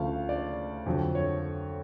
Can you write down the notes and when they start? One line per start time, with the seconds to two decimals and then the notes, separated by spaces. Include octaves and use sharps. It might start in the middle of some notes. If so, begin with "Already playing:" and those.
Already playing: D2 C#3 F3 A3 F5
0.29 D5
0.86 F2 D3 F#3
1.15 C#5